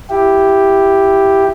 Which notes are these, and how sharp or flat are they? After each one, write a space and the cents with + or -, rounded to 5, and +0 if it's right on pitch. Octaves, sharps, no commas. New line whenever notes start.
E4 +10 G4 +0